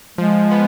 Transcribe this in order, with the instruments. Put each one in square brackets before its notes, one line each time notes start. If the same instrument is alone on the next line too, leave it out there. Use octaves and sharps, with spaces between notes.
[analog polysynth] F3 [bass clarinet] G#3
[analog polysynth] B3